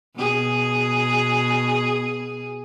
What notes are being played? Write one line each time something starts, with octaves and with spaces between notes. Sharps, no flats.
B2 G#4